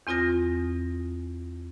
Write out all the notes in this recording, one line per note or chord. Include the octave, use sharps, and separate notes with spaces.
E2 C4 F4 D#6 A#6